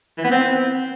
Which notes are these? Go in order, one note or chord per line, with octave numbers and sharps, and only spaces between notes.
E3
B3
C4